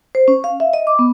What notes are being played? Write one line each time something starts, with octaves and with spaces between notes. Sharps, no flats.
C5
C#4
F5
E5
D#5
D6
B3